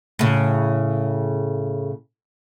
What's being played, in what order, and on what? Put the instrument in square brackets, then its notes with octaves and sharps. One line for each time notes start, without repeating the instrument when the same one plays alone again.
[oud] A2 C#3